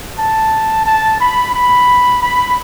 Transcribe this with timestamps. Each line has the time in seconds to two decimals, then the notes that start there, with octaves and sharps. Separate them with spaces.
0.17 A5
0.85 A5
1.19 B5
1.53 B5
2.21 B5